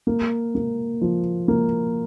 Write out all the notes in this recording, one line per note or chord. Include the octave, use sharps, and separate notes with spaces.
A#3
A#3
F3
A#3